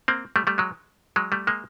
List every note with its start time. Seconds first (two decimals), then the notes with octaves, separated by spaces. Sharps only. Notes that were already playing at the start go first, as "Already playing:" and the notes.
0.08 A#3 C4
0.36 G3 A3
0.47 G3 A3
0.58 F#3 G#3
1.16 F#3 G#3
1.32 G3 A3
1.47 G#3 A#3